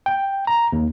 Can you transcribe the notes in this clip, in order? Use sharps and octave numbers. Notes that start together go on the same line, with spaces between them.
G5
A#5
D#2